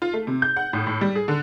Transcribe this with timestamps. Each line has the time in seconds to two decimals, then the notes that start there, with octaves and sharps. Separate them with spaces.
0.02 F4
0.13 A3
0.27 C3
0.42 G6
0.56 F#5
0.73 A2
0.87 A2
1.01 G3
1.15 G#4
1.28 D3